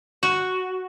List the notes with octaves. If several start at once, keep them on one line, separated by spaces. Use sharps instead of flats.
F#4